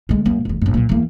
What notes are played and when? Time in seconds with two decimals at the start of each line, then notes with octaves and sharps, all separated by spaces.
0.09 D2 G#3
0.26 F#2 A#3
0.45 F1 E2
0.62 A#1 F#2
0.74 A#2 F#3
0.89 E2 A#3